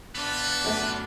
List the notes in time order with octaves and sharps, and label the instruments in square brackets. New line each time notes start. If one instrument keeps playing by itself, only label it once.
[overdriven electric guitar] B3 F4 [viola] D4 [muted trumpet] B4
[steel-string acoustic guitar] F#2 A3